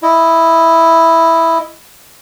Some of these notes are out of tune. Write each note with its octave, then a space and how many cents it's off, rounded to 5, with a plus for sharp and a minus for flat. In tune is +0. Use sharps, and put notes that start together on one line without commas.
E4 +0 D#5 +0